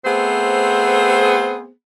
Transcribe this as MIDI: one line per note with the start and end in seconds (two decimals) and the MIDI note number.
0.05 1.69 57
0.05 1.69 59
0.05 1.69 60
0.05 1.69 68
0.05 1.69 72